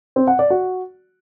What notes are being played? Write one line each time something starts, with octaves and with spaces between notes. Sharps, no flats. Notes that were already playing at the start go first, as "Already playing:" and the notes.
C4
F#5
D5
F#4